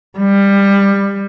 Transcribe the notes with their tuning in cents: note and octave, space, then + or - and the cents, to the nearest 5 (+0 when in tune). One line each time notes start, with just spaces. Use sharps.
G3 +20